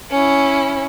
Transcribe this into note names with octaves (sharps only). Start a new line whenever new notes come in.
C#4 E4